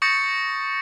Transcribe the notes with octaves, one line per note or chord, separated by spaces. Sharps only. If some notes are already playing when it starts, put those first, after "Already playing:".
C#6 D#6 G6 A6 A#6 C#7